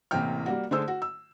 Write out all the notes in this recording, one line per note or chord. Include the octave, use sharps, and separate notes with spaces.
A1 C3 E3 A#3 G5 F6
G3 A#3 F#4
D3 A3 G#4 C5 E6
F#4
E6